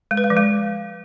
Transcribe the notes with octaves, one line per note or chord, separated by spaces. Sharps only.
G#3
B4
G#3
F3
G#3